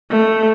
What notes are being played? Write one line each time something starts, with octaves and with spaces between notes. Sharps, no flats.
A3